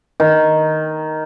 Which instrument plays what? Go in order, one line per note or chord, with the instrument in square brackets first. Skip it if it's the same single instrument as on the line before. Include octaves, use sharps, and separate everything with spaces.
[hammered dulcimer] D#3